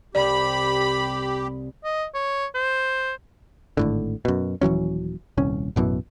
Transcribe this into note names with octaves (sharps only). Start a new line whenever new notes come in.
C2 G4 D5 B5
D#5
C#5
C5
G#1 A2 D3
F#2 B2
D#1 E3 F#3 C#4
D#1 C2 C#4
A1 F#2 B2 E3